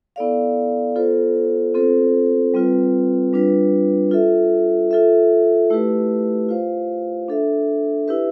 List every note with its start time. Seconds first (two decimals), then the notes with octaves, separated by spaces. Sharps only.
0.16 B3 E4 A4 D5 F5
0.96 B3 F4 A4 C5
1.74 C4 F4 A4 C5
2.54 G3 C4 F4 B4
3.33 G3 D4 F4 B4
4.11 F4 A4 E5
4.91 F4 A4 E5
5.70 A3 E4 G4 B4
6.49 F4 C5 F5
7.28 D4 A4 E5
8.07 E4 G4 B4 E5